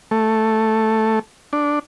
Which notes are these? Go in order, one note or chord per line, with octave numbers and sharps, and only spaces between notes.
A3
D4